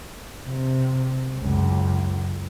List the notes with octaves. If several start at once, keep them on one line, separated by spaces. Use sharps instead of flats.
C3
C#2 F#2